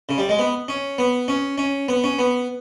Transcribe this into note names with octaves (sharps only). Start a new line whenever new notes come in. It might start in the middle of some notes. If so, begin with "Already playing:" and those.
C#3
G3
G#3
B3
C#4
B3
C#4
C#4
B3
C#4
B3